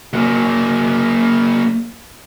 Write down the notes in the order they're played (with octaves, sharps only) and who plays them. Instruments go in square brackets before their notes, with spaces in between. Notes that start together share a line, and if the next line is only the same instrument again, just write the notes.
[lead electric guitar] F#3 A#3